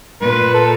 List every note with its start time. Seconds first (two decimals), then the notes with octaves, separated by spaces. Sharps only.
0.21 A#2 B4
0.54 A4